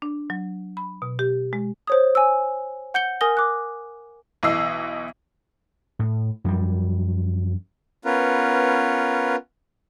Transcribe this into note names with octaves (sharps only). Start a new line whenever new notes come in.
D4
F#3
B5
B2
G4
G#3
C5 C#5 D#6
G#5 E6
F#5 G6 C#7 G7
A#4 G#5 D#6 F6 A#6 G7
D6 F#6
B1 E3 D#5 E6 C7
A2
F#2 F3 G3
B3 C#4 F4 A#4 B4